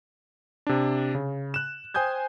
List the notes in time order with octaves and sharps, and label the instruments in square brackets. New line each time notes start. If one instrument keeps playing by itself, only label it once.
[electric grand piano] C3 D4
C#3
F#6 E7
C5 G5 G#5 D#6 G6 G#6